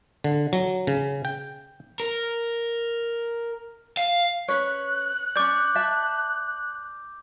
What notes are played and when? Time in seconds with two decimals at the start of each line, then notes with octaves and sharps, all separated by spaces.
0.24 D3
0.53 F#3
0.87 C#3
1.25 G5
2.00 A#4
3.97 F5
4.48 C#4 B4 C#5 F#6
5.36 C#4 D5 D6 G6
5.75 D5 E5 A5